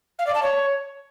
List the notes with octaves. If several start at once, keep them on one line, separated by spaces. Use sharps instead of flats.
F5
D5
A5
C#5